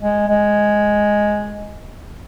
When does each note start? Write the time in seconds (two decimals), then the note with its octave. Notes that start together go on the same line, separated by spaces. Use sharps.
0.02 G#3
0.28 G#3